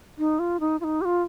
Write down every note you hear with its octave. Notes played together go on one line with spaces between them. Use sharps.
D#4
F4
D#4
F4
D#4
G4
F4